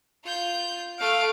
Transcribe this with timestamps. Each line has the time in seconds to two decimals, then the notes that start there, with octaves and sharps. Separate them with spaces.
0.24 F4 G6
0.99 A3 F5 D7